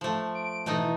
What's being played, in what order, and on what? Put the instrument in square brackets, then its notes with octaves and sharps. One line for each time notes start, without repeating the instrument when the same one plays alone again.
[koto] F3 A3
[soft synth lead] D7
[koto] B2 A3 D#4 [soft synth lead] E3